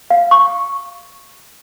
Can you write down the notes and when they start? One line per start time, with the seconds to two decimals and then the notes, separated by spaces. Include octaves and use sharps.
0.10 F5
0.31 C#6